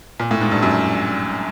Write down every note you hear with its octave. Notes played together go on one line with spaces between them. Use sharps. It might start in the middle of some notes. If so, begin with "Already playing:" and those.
A#2
A2
G#2
G2
F#2